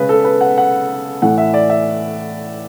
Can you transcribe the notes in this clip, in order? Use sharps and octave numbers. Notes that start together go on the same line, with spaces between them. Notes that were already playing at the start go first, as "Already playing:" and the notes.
Already playing: C#3 G#3 B4
A4
B4
F#5
F#5
A2 E3 A3 F#5
E5
D5
E5